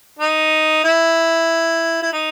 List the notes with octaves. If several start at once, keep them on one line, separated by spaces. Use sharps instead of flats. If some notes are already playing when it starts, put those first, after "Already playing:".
D#4
E4
E4
D#4